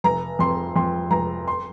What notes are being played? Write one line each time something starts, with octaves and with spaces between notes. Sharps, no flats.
F1 A#5
F2 C6
F2 C6
F1 A#5
C6